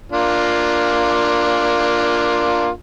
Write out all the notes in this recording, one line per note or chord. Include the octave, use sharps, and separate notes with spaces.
A#3 D4 F4